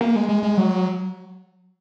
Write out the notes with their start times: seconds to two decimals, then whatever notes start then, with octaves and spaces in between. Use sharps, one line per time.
0.01 A#3
0.16 G#3
0.29 G#3
0.43 G#3
0.57 F#3